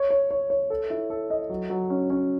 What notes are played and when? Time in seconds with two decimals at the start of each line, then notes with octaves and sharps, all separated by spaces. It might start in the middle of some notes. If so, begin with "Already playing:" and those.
Already playing: C#5
0.10 C#5
0.31 C#5
0.50 C#5
0.70 A4
0.90 E4
1.10 A4
1.30 D#5
1.49 F#3
1.70 F#3
1.90 C#4
2.10 C#4